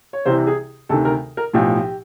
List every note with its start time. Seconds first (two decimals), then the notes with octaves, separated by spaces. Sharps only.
0.13 C#5
0.25 C2 C3 E3 C5
0.47 G#4
0.89 D2 C3 D#3 A4
1.05 A#4
1.37 A#4
1.53 B1 A2 F3 G4